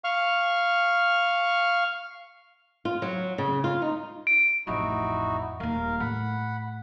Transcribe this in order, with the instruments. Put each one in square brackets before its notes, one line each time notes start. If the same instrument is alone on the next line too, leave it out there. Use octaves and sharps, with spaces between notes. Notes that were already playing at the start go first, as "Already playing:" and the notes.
[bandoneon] F5 C#6 F6
[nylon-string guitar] F4
F#3
C#3
F4
D#4
[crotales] D7
[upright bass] A1 F2 [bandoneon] D#4 E4 F#4
[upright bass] D#1 A#3 [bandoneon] A#4 F5
[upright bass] A2 [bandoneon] F#5 B5